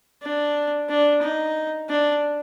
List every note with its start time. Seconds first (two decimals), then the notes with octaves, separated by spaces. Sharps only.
0.22 D4
0.89 D4
1.22 D#4
1.89 D4